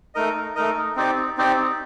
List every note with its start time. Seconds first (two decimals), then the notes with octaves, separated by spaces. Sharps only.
0.15 A3 D#4 A#4 D#5
0.56 A3 D#4 A#4 D#5
0.96 C4 D#4 G4 D5
1.38 C4 D#4 G4 D5